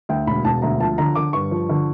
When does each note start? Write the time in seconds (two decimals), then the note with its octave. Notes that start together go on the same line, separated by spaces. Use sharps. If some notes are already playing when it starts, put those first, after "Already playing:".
0.09 D2 G5
0.27 E1 B5
0.45 E1 A5
0.62 D2 A#5
0.80 F3 A5
0.98 D3 A#5
1.15 D3 D6
1.33 G2 C#6
1.51 F3
1.69 D3